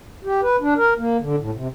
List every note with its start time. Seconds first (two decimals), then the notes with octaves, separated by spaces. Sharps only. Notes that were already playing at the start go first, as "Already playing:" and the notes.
0.25 G4
0.43 B4
0.61 D4
0.77 A#4
0.98 A#3
1.21 D3
1.38 A2
1.54 C3